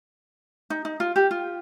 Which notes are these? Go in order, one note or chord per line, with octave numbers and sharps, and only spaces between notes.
D#4
D#4
F4
G4
F4